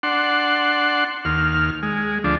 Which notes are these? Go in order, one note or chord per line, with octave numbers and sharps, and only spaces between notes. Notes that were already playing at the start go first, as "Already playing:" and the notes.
D4 F#5 C6
D#2 F6
G#3
D2 F3 D4